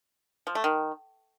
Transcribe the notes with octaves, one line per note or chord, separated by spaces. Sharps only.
F3
A3
D#3